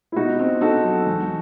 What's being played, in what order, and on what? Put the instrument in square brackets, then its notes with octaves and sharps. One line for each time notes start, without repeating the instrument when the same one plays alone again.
[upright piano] E4
[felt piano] B2 [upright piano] D#4 F#4
[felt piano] C4
[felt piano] D#4 [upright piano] F#4 A4
[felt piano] F#3
E2